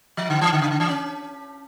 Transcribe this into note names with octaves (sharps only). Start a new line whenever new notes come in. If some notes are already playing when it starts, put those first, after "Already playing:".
F3
D3
E3
D3
C#3
D3
E3
C#4